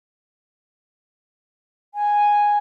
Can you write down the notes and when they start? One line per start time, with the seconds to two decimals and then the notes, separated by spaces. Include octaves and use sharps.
1.95 G#5